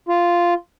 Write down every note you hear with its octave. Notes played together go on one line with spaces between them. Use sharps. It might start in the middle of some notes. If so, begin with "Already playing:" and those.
F4